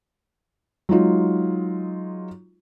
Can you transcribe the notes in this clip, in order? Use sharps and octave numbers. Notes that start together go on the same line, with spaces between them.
F#3 G#3 D#4 F4